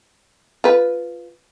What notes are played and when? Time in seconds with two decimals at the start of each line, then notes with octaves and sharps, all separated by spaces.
0.64 F4 B4